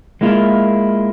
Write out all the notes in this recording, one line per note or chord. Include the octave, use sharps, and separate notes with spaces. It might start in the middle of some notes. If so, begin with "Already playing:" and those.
G#3 A#3 E4 F4